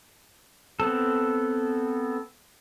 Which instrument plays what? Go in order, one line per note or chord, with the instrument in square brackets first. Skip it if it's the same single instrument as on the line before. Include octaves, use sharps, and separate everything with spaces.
[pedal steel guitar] B3 C4 A4